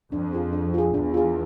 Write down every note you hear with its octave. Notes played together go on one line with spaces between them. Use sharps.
F2 D4
F4 G#4
D4
F4 G#4
E2 D4
F4 G#4